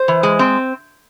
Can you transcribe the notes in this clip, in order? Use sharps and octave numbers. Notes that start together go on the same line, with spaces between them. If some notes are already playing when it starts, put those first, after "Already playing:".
Already playing: C5
E3
G#3
C4